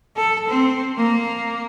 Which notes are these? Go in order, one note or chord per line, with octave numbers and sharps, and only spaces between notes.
A4
C4
A#3